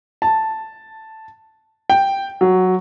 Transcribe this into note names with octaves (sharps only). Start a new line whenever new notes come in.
A5
G5
F#3